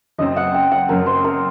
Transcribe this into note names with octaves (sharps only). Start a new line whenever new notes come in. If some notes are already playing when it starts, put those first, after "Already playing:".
F#1 F#2 F#3 C4 D#5
F#5
G5
F#5
F#1 F#2 F#3 C4 A#4
C5
A#4